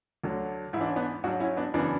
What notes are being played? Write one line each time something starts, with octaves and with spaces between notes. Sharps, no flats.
D2 D3 F#3
G#2 E3 D4 E4
C#4
B3 D4
G#2 F#3 D4 F#4
C#4 E4
B3 D4
F#2 C#3 E3 B3 D4